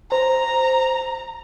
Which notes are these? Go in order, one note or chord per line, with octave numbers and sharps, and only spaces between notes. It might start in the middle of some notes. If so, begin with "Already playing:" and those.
C5 A#5